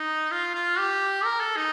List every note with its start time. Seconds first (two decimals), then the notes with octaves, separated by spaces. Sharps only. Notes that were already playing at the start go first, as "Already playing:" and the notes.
Already playing: D#4
0.31 F4
0.55 F4
0.79 G4
1.25 A#4
1.40 A4
1.56 D#4